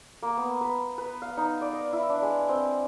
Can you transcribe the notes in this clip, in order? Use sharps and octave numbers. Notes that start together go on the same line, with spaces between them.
A#3
B3
B4
B4
F5
D#4
D5
D#5
E4
D4
G#3
C4